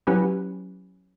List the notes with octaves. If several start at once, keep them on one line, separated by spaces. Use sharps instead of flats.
F#3 C#4 E4 G4 B4